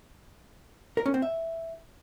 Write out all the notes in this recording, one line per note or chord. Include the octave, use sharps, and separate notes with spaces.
A#4
C#4
C4
E5